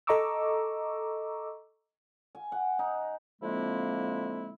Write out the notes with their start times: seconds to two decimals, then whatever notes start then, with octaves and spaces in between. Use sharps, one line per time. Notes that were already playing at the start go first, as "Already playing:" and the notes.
0.07 A4 D#5 A#5 C#6 D6 E6
2.35 G#5
2.52 F#5
2.79 D#4
3.41 D3 F3 G#3 A#3 C4 E4